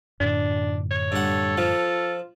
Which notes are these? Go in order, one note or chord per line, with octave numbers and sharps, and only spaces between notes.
F#2 A2 D3 D4
C#5
G2 A4 F#5
F3 F4